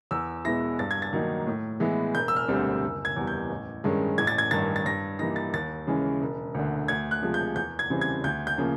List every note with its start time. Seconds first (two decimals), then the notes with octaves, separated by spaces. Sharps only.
0.11 E2 E6
0.45 B2 G#3 B3 E4 A#6
0.79 G2 A6
0.91 G#6
1.02 A6
1.13 D#3 F#3 A#3 D#4
1.47 A2
1.80 E3 G#3 B3 E4
2.14 E1 G6
2.28 E6
2.36 F6
2.48 D2 D3 G3 C4
2.82 F#1
3.05 G#6
3.16 E2 B2 G3
3.27 G6
3.50 A1
3.84 G2 D#3 G#3 C#4
4.18 A1 G#6
4.27 A6
4.38 G#6
4.51 G2 D#3 A6
4.76 A6
4.85 G2 A#6
5.19 E3 G3 A#3 D#4 A#6
5.36 A6
5.53 D#2 A6
5.87 C#3 E3 G#3 C#4
6.21 E1
6.54 D2 D3
6.88 D2 G#6
7.11 F#6
7.22 C3 F3 G#3
7.34 G6
7.56 E2 G6
7.79 G#6
7.90 C#3 E3 G3 C4
8.01 G#6
8.24 D2 G6
8.47 G6
8.57 C#3 F3 A#3